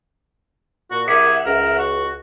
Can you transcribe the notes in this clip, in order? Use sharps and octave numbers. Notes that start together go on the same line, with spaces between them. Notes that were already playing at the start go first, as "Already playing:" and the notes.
A#2 F#4
C2 G#4 A#4 E5 F#5 D6
C#2 A#4
F#4